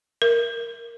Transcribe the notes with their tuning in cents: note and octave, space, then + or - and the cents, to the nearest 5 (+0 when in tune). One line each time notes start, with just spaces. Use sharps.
A#4 +0